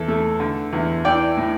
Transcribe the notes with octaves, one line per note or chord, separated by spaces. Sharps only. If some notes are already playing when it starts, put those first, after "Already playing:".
Already playing: E2 A4
A3
D3
E2
E3 D5 G5
A2